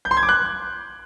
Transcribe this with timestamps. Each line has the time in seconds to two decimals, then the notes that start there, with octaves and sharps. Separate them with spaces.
0.05 G6
0.11 C6
0.17 G#6
0.23 D6
0.29 F#6